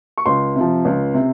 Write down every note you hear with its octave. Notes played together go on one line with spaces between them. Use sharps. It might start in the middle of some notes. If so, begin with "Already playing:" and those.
C#6
C#2 C6
C3
F3
C#2
C3